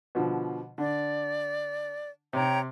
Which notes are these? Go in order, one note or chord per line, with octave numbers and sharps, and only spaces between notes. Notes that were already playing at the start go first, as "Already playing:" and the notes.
B2 D3 F3
D3 D5
C3 C#5 G5 A#5